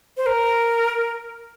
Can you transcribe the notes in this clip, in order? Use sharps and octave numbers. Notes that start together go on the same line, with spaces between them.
C5
A#4